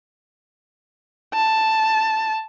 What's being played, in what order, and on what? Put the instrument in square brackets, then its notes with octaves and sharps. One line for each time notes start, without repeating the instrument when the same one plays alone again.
[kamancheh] A5